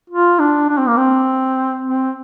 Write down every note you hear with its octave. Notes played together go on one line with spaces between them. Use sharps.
F4
D4
D4
C4
A#3
C4
C4